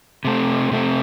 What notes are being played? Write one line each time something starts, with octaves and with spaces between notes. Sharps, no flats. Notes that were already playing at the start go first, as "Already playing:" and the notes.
C3 A3 C4
C3 A3 C4